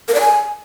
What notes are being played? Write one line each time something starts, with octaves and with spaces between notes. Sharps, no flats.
A#4
D5
G#5